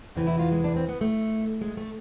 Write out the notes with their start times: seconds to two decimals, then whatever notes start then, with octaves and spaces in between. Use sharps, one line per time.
0.15 E2 C3 E3
0.27 E4
0.39 F4
0.52 G#3
0.64 D4
0.76 C4
0.89 B3
1.01 A3
1.61 G#3
1.77 A3